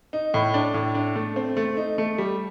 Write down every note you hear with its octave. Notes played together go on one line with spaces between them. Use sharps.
D#4
A2
D4
A2
D4
A3
C4
A3
D#4
A3
G3